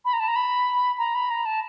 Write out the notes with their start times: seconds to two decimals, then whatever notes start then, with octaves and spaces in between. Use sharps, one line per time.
0.05 B5
0.13 A#5
0.20 A5
0.28 A#5
0.36 B5
0.98 A#5
1.15 B5
1.30 A#5
1.46 A5